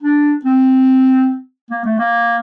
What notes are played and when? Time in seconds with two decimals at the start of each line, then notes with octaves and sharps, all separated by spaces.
0.03 D4
0.45 C4
1.71 A#3
1.85 A3
1.99 A#3